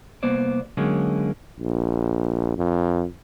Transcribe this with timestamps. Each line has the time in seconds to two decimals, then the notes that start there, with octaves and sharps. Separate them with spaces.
0.23 C2 A#3 B3 C5 D5
0.77 D3 F#3 G#3 A#3 C#4
1.60 A#1
2.57 F2